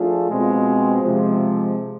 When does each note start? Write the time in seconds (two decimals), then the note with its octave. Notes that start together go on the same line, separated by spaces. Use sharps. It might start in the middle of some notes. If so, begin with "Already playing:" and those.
Already playing: F3 A3 D4 F4 G#4
0.28 B2 G#3 C4 F4
1.03 C3 F3 G#3